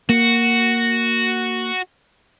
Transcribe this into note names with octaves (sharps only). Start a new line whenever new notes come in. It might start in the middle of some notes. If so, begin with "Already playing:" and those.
A#3 F#4